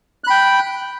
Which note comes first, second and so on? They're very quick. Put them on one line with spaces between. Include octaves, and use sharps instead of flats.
F#6 B5 G5